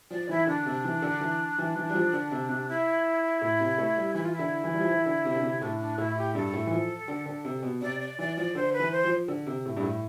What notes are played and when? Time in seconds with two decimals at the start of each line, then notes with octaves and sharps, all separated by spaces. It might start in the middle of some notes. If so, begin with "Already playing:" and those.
0.10 F3 D5
0.29 E3 E4
0.47 D3 D4
0.66 C3
0.85 E3
1.02 D3
1.21 E3
1.58 E3
1.76 E3
1.90 G3
1.94 F3
2.13 D3
2.31 C3
2.49 C3
2.68 E4
3.41 A2
3.60 C3
3.78 A3
3.96 G3
4.15 E3 E4
4.23 F4
4.32 E4
4.39 D3
4.64 E3
4.74 G3
4.80 F3
4.88 E3
5.06 D3
5.25 C3
5.35 D3
5.43 C3
5.61 A2 D4
5.80 D4
5.98 A2 E4
6.17 G4
6.35 G2 A4
6.54 A2
6.67 E3
6.71 F3
7.08 D3
7.26 D3
7.45 C3
7.63 B2
7.82 C3 D5
8.00 D5
8.19 E3 D5
8.37 F3 D5
8.55 D3 C5
8.73 B4
8.79 E3
8.91 C5
9.04 F3
9.28 D3
9.47 C3
9.66 A2
9.77 G2
9.83 A2